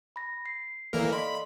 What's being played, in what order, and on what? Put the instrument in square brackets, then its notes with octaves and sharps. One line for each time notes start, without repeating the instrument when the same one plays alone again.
[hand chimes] B5 A#6
C7
[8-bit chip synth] E3 A#3 A#4 [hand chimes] A4 D5 F5
[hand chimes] D#5 C6 [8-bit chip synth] B5